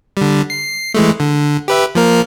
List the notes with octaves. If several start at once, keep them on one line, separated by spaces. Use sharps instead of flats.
D3 G3
C7
E3 G#3 A3
D3
G4 B4 E5
F3 A#3 A#4